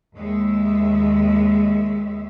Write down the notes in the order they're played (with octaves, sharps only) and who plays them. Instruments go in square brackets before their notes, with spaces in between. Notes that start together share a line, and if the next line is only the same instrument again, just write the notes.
[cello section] D#2 G#3 E5